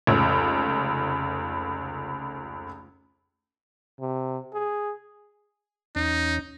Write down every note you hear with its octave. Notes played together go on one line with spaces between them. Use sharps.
F1 C#2
C3
G#4
E2 C#4 D#4